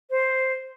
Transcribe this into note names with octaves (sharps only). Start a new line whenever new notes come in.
C5